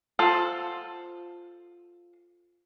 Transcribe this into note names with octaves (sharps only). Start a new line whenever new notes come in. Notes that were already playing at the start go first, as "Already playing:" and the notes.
F4 A4 C5 F#5